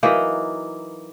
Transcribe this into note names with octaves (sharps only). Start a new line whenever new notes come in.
E3 F#3 A#3 D#4